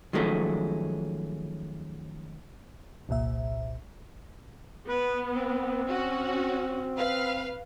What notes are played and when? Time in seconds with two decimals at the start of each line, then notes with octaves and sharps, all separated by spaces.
0.13 D#3 F3 F#3 G#3 A3 C#4
3.09 G1 C2 A#2 E5
4.87 B3 B4
5.35 C4
5.89 C#4 F#4
6.97 B4 F5